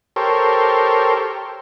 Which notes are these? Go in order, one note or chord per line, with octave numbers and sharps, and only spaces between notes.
G4 A4 A#4 C5 C#5